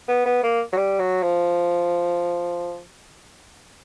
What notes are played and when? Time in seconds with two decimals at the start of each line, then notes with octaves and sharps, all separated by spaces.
0.08 B3
0.26 B3
0.43 A#3
0.73 F#3
0.77 G3
1.00 F#3
1.23 F3